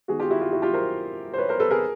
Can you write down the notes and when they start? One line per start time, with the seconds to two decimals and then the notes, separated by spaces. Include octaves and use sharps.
0.08 D#3 G#3 B3 F#4 G#4
0.20 F4 G4
0.30 E4 F#4
0.41 F4 G4
0.52 E4 F#4
0.62 F4 G4
0.73 A#4 C5
1.34 C5
1.38 B4 C#5
1.49 A#4 C5
1.60 A4 B4
1.71 G#4 A#4